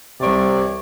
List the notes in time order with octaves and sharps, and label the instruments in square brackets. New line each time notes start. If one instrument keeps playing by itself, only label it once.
[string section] C2 [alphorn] C3 [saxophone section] C#5 D5